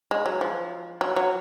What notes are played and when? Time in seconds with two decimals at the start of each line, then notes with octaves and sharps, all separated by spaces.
0.11 G#3
0.26 F#3
0.41 F3
1.01 F#3
1.16 F#3